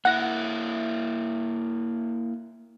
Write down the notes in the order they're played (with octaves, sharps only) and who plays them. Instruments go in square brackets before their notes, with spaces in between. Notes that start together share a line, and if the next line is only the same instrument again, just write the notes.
[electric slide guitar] A#3 E4 [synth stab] F#5 A#6